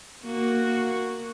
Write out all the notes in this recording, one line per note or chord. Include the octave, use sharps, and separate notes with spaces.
A#3 F#4